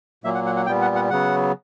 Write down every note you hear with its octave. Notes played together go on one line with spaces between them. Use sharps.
A#2 F#3 A#3 E5
F#5
F#5
F#5
A#2 G3 B3 G5
F#5
F#5
C#3 F#3 B3 F#5